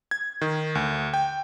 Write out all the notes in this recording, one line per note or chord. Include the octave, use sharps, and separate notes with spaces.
G#6
D#3
D2
G5